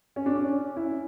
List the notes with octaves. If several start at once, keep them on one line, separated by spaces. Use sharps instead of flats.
C#4
D4
C#4
C#4 E4